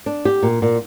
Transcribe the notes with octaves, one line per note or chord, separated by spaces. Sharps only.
D4
G4
A#2
A#2